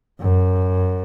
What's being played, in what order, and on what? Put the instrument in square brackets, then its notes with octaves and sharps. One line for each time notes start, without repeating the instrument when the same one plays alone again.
[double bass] F#2